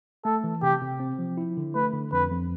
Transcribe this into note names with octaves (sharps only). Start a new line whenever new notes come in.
A3 A4
E3
C3 G4
C3
C4
F3
E4
D3
A3 B4
D3
F2 B4
F2